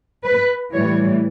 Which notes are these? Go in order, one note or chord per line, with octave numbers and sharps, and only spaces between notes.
B4
A2 E3 G3 C#5